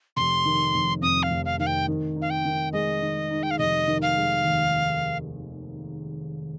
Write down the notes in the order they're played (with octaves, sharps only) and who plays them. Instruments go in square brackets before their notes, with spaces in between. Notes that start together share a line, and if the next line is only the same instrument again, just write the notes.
[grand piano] F1 [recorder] C6
[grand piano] D#3
F1
[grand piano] F2 [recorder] D#6
[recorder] F5
[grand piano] F1
[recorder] F5
[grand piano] D#3 [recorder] F5
[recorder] G5
[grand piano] D#3
D#4
[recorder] F5
G5
[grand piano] D#3
[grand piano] G#3 [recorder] D#5
[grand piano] D#3
D#4
[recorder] G5
F5
[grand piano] F1 [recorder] D#5
[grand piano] D#3
[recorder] F5
[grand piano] G#3
D#2